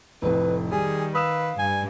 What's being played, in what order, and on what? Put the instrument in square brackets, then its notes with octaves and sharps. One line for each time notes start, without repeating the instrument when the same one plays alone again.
[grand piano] F1 F2 A2 [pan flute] B4
[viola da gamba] D#3 [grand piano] G3 [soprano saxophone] G#4 [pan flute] G#5
[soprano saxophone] B4 [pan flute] F5 [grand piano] D#6 E6 E7
[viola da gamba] G2 [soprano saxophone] G#5